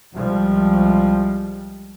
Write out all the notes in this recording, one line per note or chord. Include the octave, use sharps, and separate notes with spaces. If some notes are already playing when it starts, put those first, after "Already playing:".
C2 F3 G3 G#3